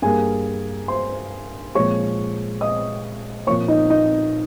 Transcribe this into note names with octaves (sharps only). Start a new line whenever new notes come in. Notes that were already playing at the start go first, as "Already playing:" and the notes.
G2 G3 A#3 G#4 G#5
C5 C6
A#2 F3 G#3 C#5 C#6
D#5 D#6
A#2 F3 A#3 C#5 C#6
D#4 D#5
D#4 D#5